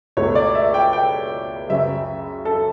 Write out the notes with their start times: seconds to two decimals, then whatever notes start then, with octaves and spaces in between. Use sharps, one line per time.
0.17 C#2 B2 A3 C#5
0.35 D5
0.55 E5
0.74 G5
0.93 G5
1.69 F#2 C#3 F#3 C#4 E5
2.45 A4